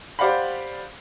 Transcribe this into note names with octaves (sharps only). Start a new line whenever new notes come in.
G4 C5 D5 F5 F#5 B5